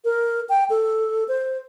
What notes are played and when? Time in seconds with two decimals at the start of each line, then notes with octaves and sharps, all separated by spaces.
0.04 A#4
0.49 G5
0.70 A4
1.28 C5